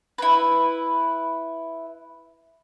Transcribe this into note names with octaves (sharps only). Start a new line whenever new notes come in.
E4 B4